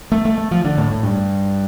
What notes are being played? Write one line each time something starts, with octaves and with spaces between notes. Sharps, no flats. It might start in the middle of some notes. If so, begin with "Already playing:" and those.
A3
A3
A3
F3
D3
A2
A2
G2